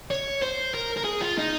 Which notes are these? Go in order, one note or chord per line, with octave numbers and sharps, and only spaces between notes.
C#5
C5
A#4
A#4
G#4
F4
D#4